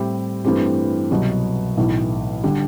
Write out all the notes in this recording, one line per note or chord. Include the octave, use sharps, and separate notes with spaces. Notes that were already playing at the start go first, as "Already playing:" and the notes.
Already playing: A2 G3 C4 E4 G4
G2 E3 A3 C4 G4
C2 B2 F#3 B3
B1 A2 E3
D3 G3